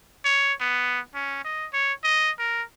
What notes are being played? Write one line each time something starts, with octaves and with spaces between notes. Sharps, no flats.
C#5
B3
C#4
D#5
C#5
D#5
A#4